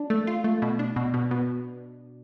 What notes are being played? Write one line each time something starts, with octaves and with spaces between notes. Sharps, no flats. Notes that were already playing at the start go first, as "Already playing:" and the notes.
Already playing: D4
A3
F4
A3
B2
D4
B2
B2
B2